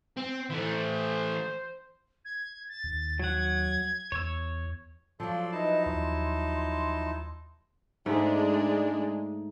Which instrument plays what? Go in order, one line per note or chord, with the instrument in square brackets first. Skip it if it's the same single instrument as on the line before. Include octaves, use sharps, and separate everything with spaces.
[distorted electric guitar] C4
[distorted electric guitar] E3 A3 [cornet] C5
[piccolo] G#6
A6
[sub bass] D#2
[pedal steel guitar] F#3 F#5 [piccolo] G#6
[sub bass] E2 [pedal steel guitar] C#5 E6
[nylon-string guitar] F3 F#3 [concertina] A4 D5 C6 [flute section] F5
[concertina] D#4 E4 A5 [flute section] B4 D#5
[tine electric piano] D#2 [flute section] C6
[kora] G#2 A3 [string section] G#3 D4